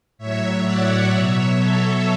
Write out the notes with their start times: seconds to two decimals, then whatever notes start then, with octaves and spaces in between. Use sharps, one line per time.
0.18 A2 F#3 C#5 E5
0.63 D5 F#5
1.07 B2 F#3 C#5 E5
1.53 A4 C#5